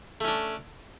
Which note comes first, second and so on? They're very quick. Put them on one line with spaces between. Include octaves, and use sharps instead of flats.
A3 C#4 D4